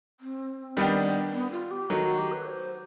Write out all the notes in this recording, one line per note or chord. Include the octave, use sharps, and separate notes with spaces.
C4
D#3 G3 B3 D4 G4
B3
F4
G4
D#3 F#3 A3 F#4
F#4
G4
B4
C#5
C5